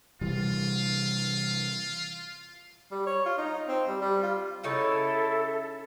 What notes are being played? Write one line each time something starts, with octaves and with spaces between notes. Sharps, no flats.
C3 E3 G3 F4
G3
C#5
F4
D#4
C4
G3
G3
F4
C#3 D#4 E4 A4 C#5 E5